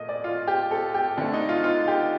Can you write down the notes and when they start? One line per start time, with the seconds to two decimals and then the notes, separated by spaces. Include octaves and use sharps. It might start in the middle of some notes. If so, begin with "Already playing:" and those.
Already playing: A#2 A3 D#5
0.09 D5
0.24 F4
0.47 G4
0.71 A4
0.94 G4
1.18 D3 A3 D4
1.33 D#4
1.49 F4
1.64 F4
1.88 G4